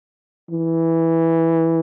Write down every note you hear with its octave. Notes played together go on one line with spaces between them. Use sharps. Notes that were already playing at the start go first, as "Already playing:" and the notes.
E3